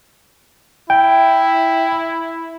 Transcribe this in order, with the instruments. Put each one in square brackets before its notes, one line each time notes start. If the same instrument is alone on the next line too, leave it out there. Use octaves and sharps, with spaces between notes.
[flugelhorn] E4 [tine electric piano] G5